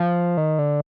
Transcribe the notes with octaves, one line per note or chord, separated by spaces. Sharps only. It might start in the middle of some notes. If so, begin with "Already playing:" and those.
Already playing: F3
D#3
D3